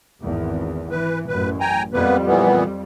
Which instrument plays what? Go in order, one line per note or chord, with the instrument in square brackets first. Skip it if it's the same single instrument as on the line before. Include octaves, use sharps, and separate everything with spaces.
[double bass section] G#1 E2
[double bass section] E3 [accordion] B4
[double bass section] A1 F#2 [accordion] B4
[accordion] G5 G#5 A#5
[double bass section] F2 G3 [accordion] A#3 B3 B4
[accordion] A#2 E3 B3